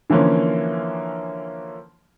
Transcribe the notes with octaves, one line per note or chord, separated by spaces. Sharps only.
D3 E3 F3 A#3 C#4